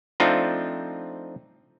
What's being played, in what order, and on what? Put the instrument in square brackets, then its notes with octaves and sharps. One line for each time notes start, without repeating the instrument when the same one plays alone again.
[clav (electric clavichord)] F3 A3 C4 D4 D#4 F4